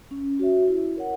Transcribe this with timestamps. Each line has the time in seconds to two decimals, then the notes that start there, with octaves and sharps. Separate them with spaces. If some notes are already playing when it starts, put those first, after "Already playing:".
0.11 C#4
0.39 F#4 C#5 E5
0.68 E4
0.96 A#4 C#5 F#5